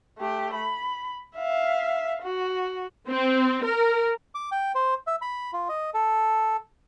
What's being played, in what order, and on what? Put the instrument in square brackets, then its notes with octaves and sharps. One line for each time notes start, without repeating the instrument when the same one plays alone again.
[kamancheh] A3 G4
B5
E5 F5
F#4
[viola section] C4
A#4
[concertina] D6
G5
C5
E5
B5
F4
D#5
A4